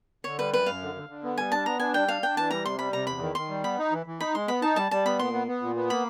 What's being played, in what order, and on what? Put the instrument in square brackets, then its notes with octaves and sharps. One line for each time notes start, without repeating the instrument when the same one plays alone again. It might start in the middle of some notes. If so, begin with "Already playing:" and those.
[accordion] D3 [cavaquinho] C#5
[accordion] G3 [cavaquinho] B4
[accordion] F#2 [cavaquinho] B4
[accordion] F#2 [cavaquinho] F5
[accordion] D3
D3
D3
B3
[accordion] G3 [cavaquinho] G#5
[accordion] D4 [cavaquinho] A5
[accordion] B3 [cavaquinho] A#5
[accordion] D4 [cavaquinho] G#5
[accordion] G3 [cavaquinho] G5
[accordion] D4 [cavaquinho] F5
[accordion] D4 [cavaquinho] G5
[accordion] E3 [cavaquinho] A5
[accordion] G3 [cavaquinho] A#5
[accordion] C3 [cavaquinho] C6
[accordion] G3 [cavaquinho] B5
[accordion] C3 [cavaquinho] A#5
[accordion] E2 [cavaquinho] B5
[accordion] D#3
[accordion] D#3 [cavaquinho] C6
[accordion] G3
[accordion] B3 [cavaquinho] B5
[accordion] D#4
E3
E3
[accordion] D#4 [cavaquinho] B5
[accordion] G#3 [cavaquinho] C6
[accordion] B3 [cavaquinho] B5
[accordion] D#4 [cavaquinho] A5
[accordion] G3 [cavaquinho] A5
[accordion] G3 [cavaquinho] A5
[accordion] B3 [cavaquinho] B5
[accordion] A#2 [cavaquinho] C6
[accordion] B3
B3
A#2
B3
[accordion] A#3 [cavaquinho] B5